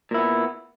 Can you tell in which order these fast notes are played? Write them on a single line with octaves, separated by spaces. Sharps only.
A#2 E4 B3